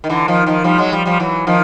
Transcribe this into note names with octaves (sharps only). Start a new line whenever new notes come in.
D#3
D3 E3
D#3 F3
D#3 F3
F3 G3
F#3 G#3
F3 G3
F3 G3
E3 F#3
D#3 F3